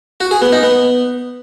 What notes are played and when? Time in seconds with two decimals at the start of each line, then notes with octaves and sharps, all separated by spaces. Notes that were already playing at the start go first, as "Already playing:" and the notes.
0.20 F#4
0.31 G#4
0.42 B3
0.52 D#4
0.63 B3